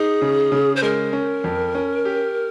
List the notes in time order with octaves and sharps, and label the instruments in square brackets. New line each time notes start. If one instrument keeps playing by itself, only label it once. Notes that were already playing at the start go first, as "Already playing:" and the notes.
Already playing: [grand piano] D#4 [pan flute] G#4
[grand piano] C#3
C#3
[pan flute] C5
[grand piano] G#3 [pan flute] A#4
[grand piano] C#4
F2
C#4
G4